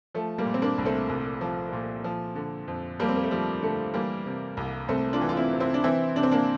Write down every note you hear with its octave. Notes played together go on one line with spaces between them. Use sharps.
F3 A3
G3 A#3
A#2
C4
A#3 D4
C2
A3 C4
C2
F3
A#2
F3
D3
F2
F2 G3 A#3
C4
A#3
A3
F3 G3
D3 A3
E3 G3 A#3
C3
C2
C2 A3 C4
D4 F4
E3
F4
C4 E4
C3
C4 E4
D4
E3 C4 E4
C3 D4
C4
A#3 D4